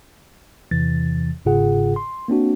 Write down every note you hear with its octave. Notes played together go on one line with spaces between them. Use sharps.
E2 C3 E3 A6
G1 G#2 C#3 F4 G#4 F#5
C6
A#3 C4 D4 F#4